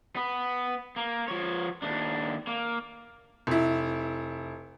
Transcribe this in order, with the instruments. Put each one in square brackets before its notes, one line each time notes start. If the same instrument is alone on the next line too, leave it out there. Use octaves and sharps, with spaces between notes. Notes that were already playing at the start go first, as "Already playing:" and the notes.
[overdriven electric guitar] B3
A#3
F3 C#5
D#2 D4
A#3
[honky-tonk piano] F1 E4